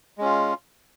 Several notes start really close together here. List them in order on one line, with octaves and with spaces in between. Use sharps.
G#3 C#4 F4